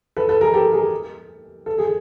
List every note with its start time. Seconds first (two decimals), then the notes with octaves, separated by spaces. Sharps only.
0.17 A4 B4
0.29 A4 B4
0.41 G#4 A#4
0.54 G4 A4
0.72 G#4 A#4
1.66 A4
1.78 G#4